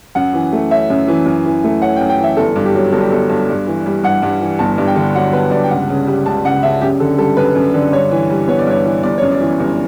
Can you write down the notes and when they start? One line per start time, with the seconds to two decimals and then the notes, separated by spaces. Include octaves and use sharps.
0.15 F#2 F#5
0.33 E3
0.53 A3
0.71 C#4 E5
0.90 F#2
1.08 E3
1.26 F#2
1.45 E3
1.64 A3
1.81 C#4 F#5
1.96 G5
2.00 F#2
2.10 G5
2.18 E3
2.24 E5
2.37 G1 A4
2.56 G2
2.65 G4
2.75 F#3
2.92 G1 A4
3.02 G4
3.12 G1 A4
3.29 G2
3.49 G2
3.67 E3
3.86 G3
4.03 G2 F#5
4.22 G2
4.41 E3
4.59 G1 A5
4.78 G2
4.87 G5
4.96 D3
5.15 F#3 F#5
5.33 G1 B4
5.51 G2 D5
5.64 G5
5.70 C#2 F#5
5.89 C#3
6.07 G3
6.26 C#2 A5
6.44 C#2 F#5
6.63 C#3 E5
6.81 F#2 G4
7.00 D3 A4
7.18 G3 A4
7.37 F#2 B4
7.55 F#2
7.74 D3
7.92 G2 C#5
8.11 E3
8.30 G3
8.48 B3 C#5
8.59 D5
8.67 G2 C#5
8.86 E3
9.03 G1 D5
9.18 F#2 C#5
9.31 D5
9.40 E3
9.60 G1